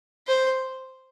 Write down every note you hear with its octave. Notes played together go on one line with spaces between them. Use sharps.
C5